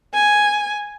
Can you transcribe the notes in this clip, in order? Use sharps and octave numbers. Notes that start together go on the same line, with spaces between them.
G#5